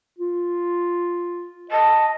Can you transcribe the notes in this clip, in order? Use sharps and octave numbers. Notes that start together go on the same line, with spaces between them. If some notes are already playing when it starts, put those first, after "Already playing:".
F4
D#5 A5